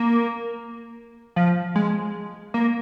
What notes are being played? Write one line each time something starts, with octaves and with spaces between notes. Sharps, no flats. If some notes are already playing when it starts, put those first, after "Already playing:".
Already playing: A#3
F3
G#3
A#3